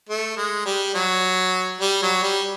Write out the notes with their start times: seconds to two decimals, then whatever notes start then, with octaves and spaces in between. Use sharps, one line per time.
0.10 A3
0.37 G#3
0.66 G3
0.95 F#3
1.80 G3
2.03 F#3
2.23 G3